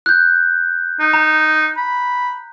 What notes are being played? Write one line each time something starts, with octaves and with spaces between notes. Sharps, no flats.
F#6 G6
D#4
A#5
B5